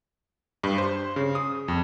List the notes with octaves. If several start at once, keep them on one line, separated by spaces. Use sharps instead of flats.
G2
C5
C#3
D#6
F2